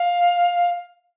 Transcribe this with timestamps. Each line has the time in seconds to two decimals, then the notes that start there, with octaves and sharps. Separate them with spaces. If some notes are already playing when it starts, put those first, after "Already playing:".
Already playing: F5